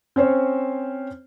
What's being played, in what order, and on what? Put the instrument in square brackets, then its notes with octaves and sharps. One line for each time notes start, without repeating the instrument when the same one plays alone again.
[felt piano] C4 C#4 C5 C#5